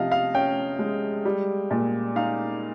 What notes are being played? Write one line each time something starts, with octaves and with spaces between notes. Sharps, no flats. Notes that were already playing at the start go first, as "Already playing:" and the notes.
Already playing: C3 F3 D#5 F5
F5
C#4 G5
G#3
G3
A#2
D#4 F5